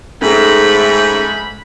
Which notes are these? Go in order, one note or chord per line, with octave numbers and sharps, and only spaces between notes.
G#2 A3 C#4 A4 B5 A#6